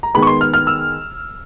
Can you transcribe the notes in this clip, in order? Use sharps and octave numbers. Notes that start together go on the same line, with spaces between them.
A#5
D#3 G#3 B3 B5
C#6
C6
F6
F6
E6